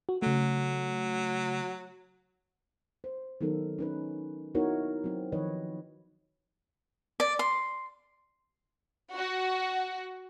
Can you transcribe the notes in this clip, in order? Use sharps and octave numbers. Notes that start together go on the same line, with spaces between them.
F#4
C#3 F#3 A3
C5
D#3 F#3 B3 D#4 A4 A#4
C#4 D#4 B4
B3 D#4 E4 F#4 A#4 C#5
F#3 C4
D#3 F3 B4 C#5 D#5
D5
C6
F#4